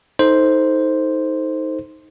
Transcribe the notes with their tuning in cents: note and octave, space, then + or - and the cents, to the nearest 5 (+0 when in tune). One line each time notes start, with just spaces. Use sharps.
D#4 +20 A4 +0 C5 +0